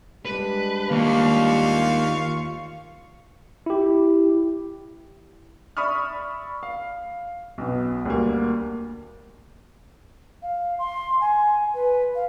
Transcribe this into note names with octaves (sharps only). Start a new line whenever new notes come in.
G3 G#3 D4 B4
D#2 A#3 F4 F5 C#6
E4 G4
D5 E5 B5 C#6 D#6 F6
F5
B1 B2
D2 G3 A#3
F5
C6
G#5
B4
F5